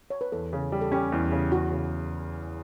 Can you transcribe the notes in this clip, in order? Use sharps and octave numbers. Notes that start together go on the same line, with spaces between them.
C#5
B4
E2 A4
C#3
G3
A4
C#4 G4
E2
C#3
E2 F#4
C#3